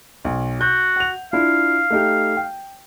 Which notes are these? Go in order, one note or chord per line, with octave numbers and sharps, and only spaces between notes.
B1
F#4 G6
F#5 F7
D4 E4 F4 F5
A3 D#4 G4
G5